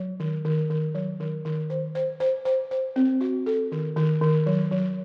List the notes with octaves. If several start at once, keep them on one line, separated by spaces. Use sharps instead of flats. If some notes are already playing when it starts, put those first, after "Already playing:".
Already playing: F#3
D#3
D#3
D#3
F#3
D#3
D#3
C5
C5
C5
C5
C5
C4
F#4
A4
D#3
D#3
D#3
F#3
F#3